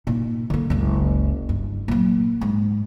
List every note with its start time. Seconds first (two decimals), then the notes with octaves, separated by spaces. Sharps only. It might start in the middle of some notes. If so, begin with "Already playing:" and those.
0.07 A#2 D#4
0.50 D3 A#3
0.70 F#1 C#2
1.49 G2
1.88 A#2 F#3
2.41 G#2